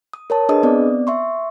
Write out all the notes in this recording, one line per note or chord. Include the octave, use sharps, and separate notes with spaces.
D#6
A#4 C#5 A5
D4 G#4 B4 D#5 D#6
B3 C4 D5
E5 C6 C#6